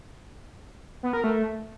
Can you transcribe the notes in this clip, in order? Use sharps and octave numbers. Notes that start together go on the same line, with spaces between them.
B3
A#4
A3